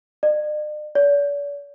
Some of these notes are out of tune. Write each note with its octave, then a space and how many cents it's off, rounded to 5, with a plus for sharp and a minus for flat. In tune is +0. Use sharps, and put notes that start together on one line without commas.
D5 +45
D5 -45